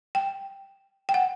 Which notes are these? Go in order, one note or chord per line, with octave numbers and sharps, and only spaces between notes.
G5
G5
F#5